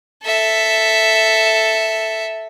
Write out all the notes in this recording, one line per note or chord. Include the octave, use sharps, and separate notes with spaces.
A4 E5